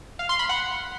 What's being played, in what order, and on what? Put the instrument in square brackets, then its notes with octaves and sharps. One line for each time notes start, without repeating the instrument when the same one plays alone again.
[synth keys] F5
C6
B5
F#5